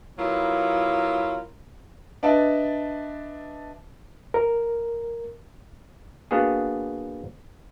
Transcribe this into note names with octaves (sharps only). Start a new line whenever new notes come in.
F#3 B3 E4 F4 A#4
D4 B4 D#5 E5 A5
A#4
A#3 B3 D4 F#4 G#4